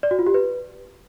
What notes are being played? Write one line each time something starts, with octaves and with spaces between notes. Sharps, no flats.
D5
F#4
F4
G4
B4